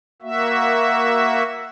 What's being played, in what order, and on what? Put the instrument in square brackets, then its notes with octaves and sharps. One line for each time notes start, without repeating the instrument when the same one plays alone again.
[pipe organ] A#3 F#4 E5